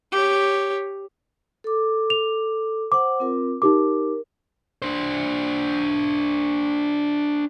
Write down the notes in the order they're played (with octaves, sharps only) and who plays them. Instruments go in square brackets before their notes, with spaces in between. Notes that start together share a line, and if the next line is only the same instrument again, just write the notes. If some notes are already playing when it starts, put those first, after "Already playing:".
[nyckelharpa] G4 C#5
[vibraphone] A4 D6
[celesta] F7
[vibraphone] C5 F#5 [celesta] D6
[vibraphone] C4 F4 A#4
[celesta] D#4 G4 D6 [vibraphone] A#4
[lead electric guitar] D4 C5